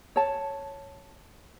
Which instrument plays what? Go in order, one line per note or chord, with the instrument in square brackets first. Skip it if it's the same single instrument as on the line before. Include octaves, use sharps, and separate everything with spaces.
[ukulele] C#5 A5